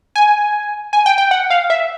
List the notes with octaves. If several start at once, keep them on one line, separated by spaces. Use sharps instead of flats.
G#5
G#5
G5
G5
F#5
F5
E5